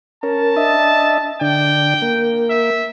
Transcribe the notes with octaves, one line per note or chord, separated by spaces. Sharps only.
C#4 A#4 A5
D4 D#5 E5
D3 D4 G5
A#3
E5